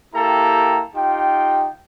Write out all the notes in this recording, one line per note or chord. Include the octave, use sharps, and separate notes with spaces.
A#3 E4 G4 A4 G5 A#5
D#4 F4 G4 G5